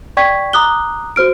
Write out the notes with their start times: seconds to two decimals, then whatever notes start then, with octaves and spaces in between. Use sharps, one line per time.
0.17 D5 G5 C#6 G#6 B6
0.53 A#5 D6 D#6 F#6 G7
1.16 F#4 C5 F6 D7